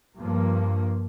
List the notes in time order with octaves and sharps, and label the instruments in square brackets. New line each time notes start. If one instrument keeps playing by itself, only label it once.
[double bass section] G2 F3 A#3